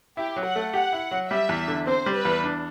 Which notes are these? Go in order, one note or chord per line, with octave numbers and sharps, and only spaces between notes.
E4 G4
F#3
F#5
A3
G4 F#5
E4
F#3
G3 E5
E2
D3
C4 C5
G3
B4
E2
D4